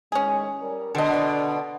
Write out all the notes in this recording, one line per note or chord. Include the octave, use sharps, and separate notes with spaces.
A2 D#3 G#3 C#4 G#4
G3 A#4
B2 D3 D4 A4 D#5